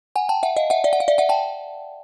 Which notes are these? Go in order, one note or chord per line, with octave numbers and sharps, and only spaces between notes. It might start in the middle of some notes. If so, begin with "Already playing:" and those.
F#5 G#5
G5 A5
E5 F#5
D#5 F5
E5 F#5
D5 E5
F#5
F5
D5 E5
E5 F#5
G5 A5